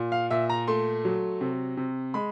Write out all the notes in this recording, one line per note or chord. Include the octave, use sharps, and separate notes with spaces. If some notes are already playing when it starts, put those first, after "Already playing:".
Already playing: A#2
F5
A#2 E5
A#5
A3 C6
F#3
C3
C3
G#3 B5